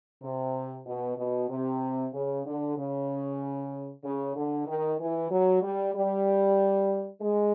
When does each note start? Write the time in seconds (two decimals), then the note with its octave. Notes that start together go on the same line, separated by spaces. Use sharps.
0.23 C3
0.86 B2
1.18 B2
1.49 C3
2.13 C#3
2.45 D3
2.77 C#3
4.04 C#3
4.36 D3
4.67 D#3
4.99 E3
5.30 F#3
5.62 G3
5.95 G3
7.21 G#3